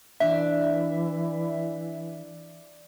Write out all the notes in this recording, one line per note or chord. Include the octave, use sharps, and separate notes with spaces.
E3 D4 D5 E5